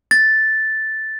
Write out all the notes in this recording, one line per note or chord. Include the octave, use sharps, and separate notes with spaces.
A6